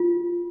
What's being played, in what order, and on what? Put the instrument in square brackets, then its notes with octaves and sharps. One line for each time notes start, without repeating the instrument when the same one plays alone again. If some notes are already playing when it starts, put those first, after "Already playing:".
Already playing: [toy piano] F4